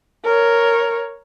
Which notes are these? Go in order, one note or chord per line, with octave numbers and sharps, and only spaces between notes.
A#4 C#5